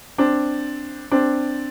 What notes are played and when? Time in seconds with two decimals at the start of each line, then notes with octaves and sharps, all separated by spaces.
0.18 C4 D4
1.11 C4 D4